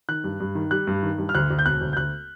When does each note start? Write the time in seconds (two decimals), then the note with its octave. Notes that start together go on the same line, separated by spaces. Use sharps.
0.09 D#3 F#6
0.24 G2
0.40 G2
0.55 D#3
0.71 G3 F#6
0.87 G2
1.03 D#3
1.18 G2
1.29 F6
1.35 D2 F#6
1.50 D2
1.59 G6
1.66 E1 F#6
1.81 D2
1.93 G6
1.96 D2 F#6